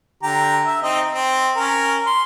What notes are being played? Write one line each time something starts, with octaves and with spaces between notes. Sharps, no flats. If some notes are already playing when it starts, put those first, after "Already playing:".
D3 G4 A#5
E5
C4 D#4 D#5
C4
C#4 A#4
C6